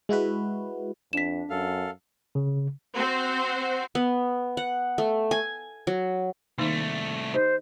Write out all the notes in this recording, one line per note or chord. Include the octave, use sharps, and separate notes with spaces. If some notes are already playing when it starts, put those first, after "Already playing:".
G#3 E4 F#4 B4
F2 D4 B6 E7
F#2 A4 F5
C#3
C4 F#4 C5
B3
F#5
A3
G#5
F#3
C2 D#3 A3 A#3 D#4
D#4 G4 C5 D#5